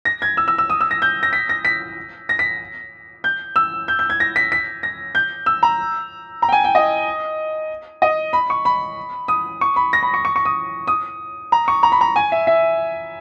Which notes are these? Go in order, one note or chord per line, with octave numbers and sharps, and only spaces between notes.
A#6
G#6
E6
E6
E6
D#6
E6
A#6
G6
A#6
B6
A#6
B6
A#6
B6
G6
E6
G6
G6
G#6
A#6
B6
B6
A#6
G6
E6
A#5
A#5
G5
G#5
G5
D#5
D#5
B5
C#6
B5
D#6
C#6
B5
A#6
B5
C#6
C#6
C#6
D#6
D#6
A#5
C#6
A#5
B5
A#5
G#5
E5
E5